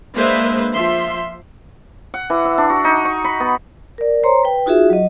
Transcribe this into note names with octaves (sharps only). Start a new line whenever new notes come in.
G#3 A#3 D4 B4 C5 E5
F3 E5 C6
F#5
E3
E5
D4
F#4
D#4
C#6
B5
B3
A#4 D5
C5 C#5 A#5 C6
B4 G5
D#4 F4 F#4 G#4 E5
F#3 D#5